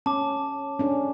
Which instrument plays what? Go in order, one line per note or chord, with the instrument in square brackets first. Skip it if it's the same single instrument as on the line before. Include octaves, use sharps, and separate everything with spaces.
[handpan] C#4 [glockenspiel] A5 D6
[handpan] C#4 D4